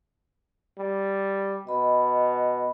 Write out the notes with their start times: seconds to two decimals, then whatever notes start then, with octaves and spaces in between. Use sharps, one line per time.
0.78 G3
1.67 B2 D#5 B5